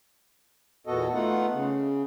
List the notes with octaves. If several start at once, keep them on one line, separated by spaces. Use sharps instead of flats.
E2 A#2 B3 F#4 A4 D#5
A3 B3 D#4 F4 F#5
C#3